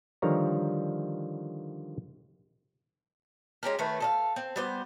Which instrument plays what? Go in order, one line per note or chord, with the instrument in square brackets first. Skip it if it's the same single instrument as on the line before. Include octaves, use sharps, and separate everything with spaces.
[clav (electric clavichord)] D3 D#3 F3 G3 C#5 A#5
[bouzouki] G#3 C#4 G4 A#4
D#3 A3 B4
A4 D#5 F5
C4
G3 B3 C5